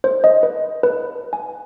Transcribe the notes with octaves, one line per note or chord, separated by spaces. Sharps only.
C5
D#5
B4
B4
G#5